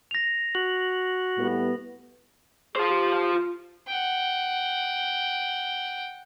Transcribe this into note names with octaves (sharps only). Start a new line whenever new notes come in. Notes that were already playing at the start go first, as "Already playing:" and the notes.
A#6 F7
F#4 F#7
A2 G3 B3
F4 G#4 C5
G4
F4
F#5 G5